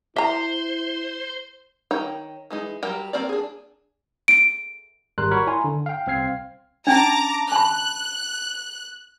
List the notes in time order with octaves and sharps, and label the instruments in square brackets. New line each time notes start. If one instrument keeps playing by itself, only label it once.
[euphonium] E4 [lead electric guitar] C5 [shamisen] E5 A#5
[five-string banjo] D#3 D#4 C#5 G5
E3 G#3 D#4
F#3 G3 A#4 G5
A#3 C4 A#4 D5
D4 G#4
[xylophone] D7
[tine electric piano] G#1 G3 A#4 C6 F#6
F#4 A#4 C#5 B5 C#6
E4 D5 G#5 A#5 C6
D3
F5 G5
C2 C4 F5 G#6 C7
[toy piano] C#4 D4 [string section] A5 A#5 D6
[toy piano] A5 B5 [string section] F#6